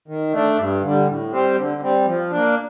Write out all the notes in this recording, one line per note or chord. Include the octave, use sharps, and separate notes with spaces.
D#3
A3 D4
G2
D3 G3
A2
G3 C4 G4 C5
D3
G3 C4
F3
A#3 D4